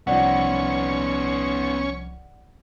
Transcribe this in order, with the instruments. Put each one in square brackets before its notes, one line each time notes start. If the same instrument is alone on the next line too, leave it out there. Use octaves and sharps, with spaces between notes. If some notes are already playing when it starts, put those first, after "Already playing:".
[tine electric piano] C2 F3 [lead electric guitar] B3 D#4 [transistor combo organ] C#4 C#6 [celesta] D5 F#5